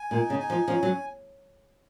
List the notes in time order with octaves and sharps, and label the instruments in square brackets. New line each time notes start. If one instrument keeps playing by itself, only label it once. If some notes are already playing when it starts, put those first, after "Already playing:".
Already playing: [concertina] G#5
[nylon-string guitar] A#2 [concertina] D#4
[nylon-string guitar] C#3
[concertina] G#5
[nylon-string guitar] F3
[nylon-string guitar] F3 [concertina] C#4
[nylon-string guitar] F#3